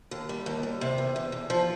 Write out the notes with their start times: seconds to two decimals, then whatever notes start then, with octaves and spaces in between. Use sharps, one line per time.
0.11 D#2
0.29 G3
0.46 D#2
0.63 D#2
0.81 C3
0.98 E2
1.16 E2
1.32 E2
1.50 F3